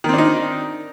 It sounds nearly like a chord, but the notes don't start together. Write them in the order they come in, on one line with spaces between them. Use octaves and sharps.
D#3 C4 D4 D#4